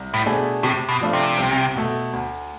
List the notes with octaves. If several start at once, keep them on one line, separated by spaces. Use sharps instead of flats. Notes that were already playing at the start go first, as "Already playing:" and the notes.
Already playing: C2
A2
B2 A3 D4 G#4
A2 C3
B2
F3 A3 D4 F4
C3
C2
B2 A3
D2